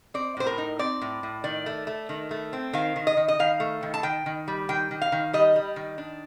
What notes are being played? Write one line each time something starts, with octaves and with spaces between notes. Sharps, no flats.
C4 D5
A2 C5
A#4
D#4
C4 D5
A2
A2
D#3 D5
A3
A3
D#3
A3
C4
D#3 F5
D#3
D#5
D#3
D#5
D#3 F5
A3
D#3
A5
D#3 G5
D#3
G3
D#3 G5
D#3
F5
D#3
G3 D#5
G3
D#3
D4